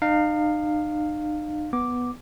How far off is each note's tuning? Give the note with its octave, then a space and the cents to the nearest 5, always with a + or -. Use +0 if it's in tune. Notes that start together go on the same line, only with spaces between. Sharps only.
D#4 -40 F5 +5
B3 +0 D6 +0